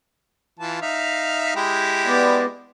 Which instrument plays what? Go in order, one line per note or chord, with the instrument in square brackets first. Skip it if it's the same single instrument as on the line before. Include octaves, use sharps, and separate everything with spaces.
[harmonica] E3 F4 A5
D#4 E5 F5
G#3 E4 G4
[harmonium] B3 D5